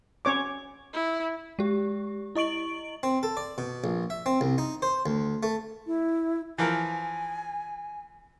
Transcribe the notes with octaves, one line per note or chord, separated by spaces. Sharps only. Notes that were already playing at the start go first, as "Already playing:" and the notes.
C#4 C#5 D6
E4
G#3 G4
E4 D#5 C#6 D7 F#7
C4
A4
D5
B2
A#1
E5
C4
C2
D#4
C5
D2
A3
E4
E3 F3 A#4 G#5